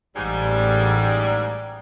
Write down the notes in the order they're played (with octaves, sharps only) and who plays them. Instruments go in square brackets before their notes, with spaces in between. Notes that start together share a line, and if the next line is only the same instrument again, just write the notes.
[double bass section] A1 [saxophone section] G#2 G3